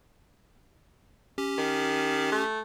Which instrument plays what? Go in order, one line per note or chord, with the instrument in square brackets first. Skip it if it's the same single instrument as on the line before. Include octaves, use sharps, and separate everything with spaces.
[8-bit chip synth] C#4 G4
[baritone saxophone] D#3
A3